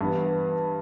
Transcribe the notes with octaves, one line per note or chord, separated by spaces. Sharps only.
G2 E3 B3